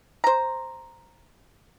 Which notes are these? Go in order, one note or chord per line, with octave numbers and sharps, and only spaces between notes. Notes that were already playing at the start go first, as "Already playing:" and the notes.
C5 A#5